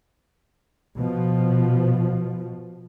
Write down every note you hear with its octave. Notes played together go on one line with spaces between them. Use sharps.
B2 F3